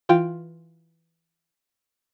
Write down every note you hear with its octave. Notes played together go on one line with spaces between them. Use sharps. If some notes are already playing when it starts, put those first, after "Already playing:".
E3 F4 G5